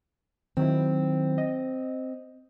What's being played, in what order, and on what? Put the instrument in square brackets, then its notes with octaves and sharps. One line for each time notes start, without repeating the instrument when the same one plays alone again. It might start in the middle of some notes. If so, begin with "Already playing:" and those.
[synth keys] D#3 F#3 E4 [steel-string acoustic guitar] C4
[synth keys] D#5